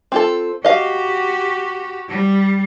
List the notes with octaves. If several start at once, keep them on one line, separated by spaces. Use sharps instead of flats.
C4 F4 A4
F#4 G4 D#5 F5
G3